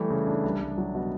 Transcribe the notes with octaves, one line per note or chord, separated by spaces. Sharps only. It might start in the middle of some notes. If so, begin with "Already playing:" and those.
Already playing: E3 G3 A3
C#3
D4
C2
C2
F#3
B2